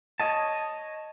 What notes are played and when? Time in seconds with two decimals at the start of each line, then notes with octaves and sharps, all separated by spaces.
0.20 C#5 D#5 A5